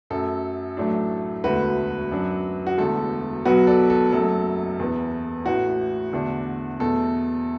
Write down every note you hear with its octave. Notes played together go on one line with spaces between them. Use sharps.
F#2 F#3 A3 A4
A1 A2 F#3 A3 D4
E1 D2 D3 A3 F#4 B4
F#2 F#3 D4
F#4
E1 E2 D3 A3 A4
B1 B2 F#3 B3 F#4 B4
A4 D5
A4
F#1 F#2 F#3 A3 A4
E2 E3 B3
A1 A2 E3 F#4
E2 D3 A3 D4
E2 B2 A3 A4